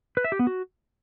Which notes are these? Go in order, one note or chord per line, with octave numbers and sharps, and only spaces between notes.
B4
E5
G4
B3
F#4